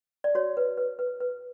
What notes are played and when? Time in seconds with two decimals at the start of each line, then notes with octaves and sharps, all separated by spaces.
0.24 D5
0.35 F#4 C#5
0.57 B4
0.78 B4
0.99 B4
1.20 B4